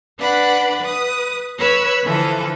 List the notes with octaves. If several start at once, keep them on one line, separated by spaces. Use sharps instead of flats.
D4 B4 D5 F#5 B5
B4 D#6
B4 C#5 B5 E6 G#6
D3 E3 F3 A4